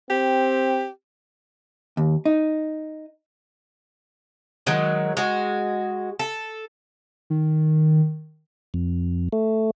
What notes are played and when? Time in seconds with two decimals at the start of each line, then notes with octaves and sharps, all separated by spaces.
0.10 C4 G4
1.97 D#2
2.25 D#4
4.67 D#3 F#3 G#3
5.17 G#3 F#4
6.19 A4
7.30 D#3
8.74 F2
9.33 A3